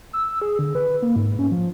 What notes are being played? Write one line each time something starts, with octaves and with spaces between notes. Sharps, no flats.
E6
G#4
D3
B4
A#3
G#2
C#4
F3